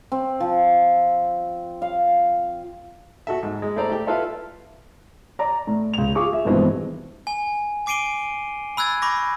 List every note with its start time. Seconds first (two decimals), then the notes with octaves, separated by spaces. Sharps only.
0.12 C4
0.40 F3
1.82 F5
3.27 F#4 A4 E5
3.43 G#2
3.62 G#3
3.76 A3 E4 C5 D5 E5 A#5
3.90 A3 G4
4.07 E4 F4 A4 B4 E5 F5
5.39 D5 A#5
5.67 A2
5.94 C#2 F7
6.15 F4 G#4 C#6 D6
6.33 E5
6.45 G2 B2 D#3 E3 G#3 C4
7.27 G#5
7.86 G#5 D6 C7 D7 D#7 G7
8.77 B5 E6 F#6 G#6 A6
9.02 B5 C#6 D6 G6 A#6